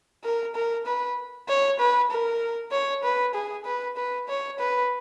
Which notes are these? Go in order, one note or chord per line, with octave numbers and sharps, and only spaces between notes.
A#4
A#4
B4
C#5
B4
A#4
C#5
B4
G#4
B4
B4
C#5
B4